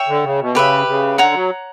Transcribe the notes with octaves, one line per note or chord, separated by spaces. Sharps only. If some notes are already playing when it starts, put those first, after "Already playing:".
Already playing: C#5 E5 G5
D3
C#3
B2
C#3 G4 B4 E5
C#3
D3 C#5 F#5 A#5
F#3